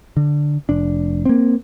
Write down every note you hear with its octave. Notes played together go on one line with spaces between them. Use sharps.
D3
F1 D4
A#3 C4